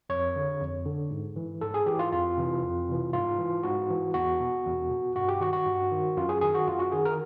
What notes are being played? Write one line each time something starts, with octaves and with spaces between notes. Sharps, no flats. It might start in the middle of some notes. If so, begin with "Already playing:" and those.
F2 C#5
D3
F2
D3
G#2
E3
G#2 A4
G#4
E3 G4
F4
F2 F4
C3 E3
F2
C3 E3
G#2 F4
E3
G#2 F#4
E3
E2 F#4
B2
E2
B2
G2 F#4
G4
D#3 F#4
F#4
G2
D#3
F#2 F4
G#4
D#3 G#4
F#4
F#2 F4
F#4
D#3 G#4
A#4